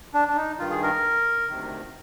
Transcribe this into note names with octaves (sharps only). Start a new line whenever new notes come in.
D4
D4
D#4
G2 D#3 F4
G#4
A#4
D2 C3 D#3